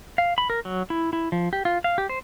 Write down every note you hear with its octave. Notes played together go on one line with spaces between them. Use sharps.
F5
B5
A#4
F#3
E4
E4
F3
G4
F4
F5
G4
C5